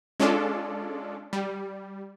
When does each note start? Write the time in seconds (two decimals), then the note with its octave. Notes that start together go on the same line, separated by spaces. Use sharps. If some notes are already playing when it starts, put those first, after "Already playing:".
0.20 G#3 C#4 D4 F4 A4 D5
1.33 G3